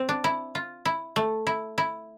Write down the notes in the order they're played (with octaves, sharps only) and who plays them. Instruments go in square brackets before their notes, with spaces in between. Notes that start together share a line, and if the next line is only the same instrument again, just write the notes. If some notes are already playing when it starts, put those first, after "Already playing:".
Already playing: [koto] C4
D4
E4
F4
E4
A3
E4
E4